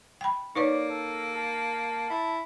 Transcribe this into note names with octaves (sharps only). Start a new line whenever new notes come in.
G5 B5
A#3 D#4 B4 C#5 D5
A4
A5
E4